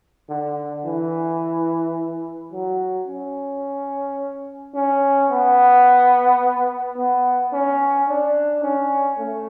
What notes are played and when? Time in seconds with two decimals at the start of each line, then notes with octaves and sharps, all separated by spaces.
0.29 D3
0.85 E3
2.52 F#3
3.07 C#4
4.75 C#4
5.30 B3
6.97 B3
7.53 C#4
8.09 D4
8.63 C#4
9.19 A3